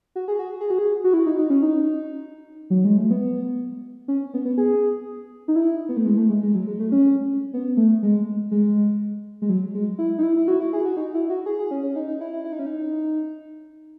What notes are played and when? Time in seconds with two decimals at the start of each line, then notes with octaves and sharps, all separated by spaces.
0.16 F#4
0.28 G#4
0.39 F#4
0.61 G#4
0.70 F#4
0.78 G#4
1.04 F#4
1.14 E4
1.26 D#4
1.39 D#4
1.50 C#4
1.62 D#4
2.70 F#3
2.85 G#3
2.97 A3
3.11 B3
4.08 C#4
4.34 B3
4.45 B3
4.58 G#4
5.48 D#4
5.56 E4
5.89 B3
5.97 A3
6.06 G#3
6.17 A3
6.30 G#3
6.43 G#3
6.55 F#3
6.67 G#3
6.80 A3
6.92 C#4
7.54 B3
7.77 A3
8.03 G#3
8.51 G#3
9.42 G#3
9.49 F#3
9.75 G#3
9.99 E4
10.18 D#4
10.23 E4
10.37 E4
10.48 F#4
10.60 E4
10.73 G#4
10.85 F#4
10.97 D#4
11.14 E4
11.30 F#4
11.46 G#4
11.59 G#4
11.71 C#4
11.83 C#4
11.96 D#4
12.08 D#4
12.21 E4
12.33 E4
12.45 E4
12.52 D#4
12.59 C#4
12.66 D#4